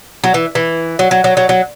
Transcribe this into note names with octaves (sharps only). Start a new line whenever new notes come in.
F#3
E3
E3
F#3
F#3
F#3
F#3
F#3